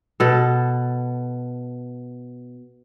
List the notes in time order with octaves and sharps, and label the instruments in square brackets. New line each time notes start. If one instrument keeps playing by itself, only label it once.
[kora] B2 A4